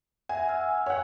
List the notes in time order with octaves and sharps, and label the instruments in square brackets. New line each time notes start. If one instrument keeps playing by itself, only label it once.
[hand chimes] E5 F#5 [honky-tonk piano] G#5
[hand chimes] F#5 E6 F6
[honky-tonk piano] C#5 F#5 [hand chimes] G#5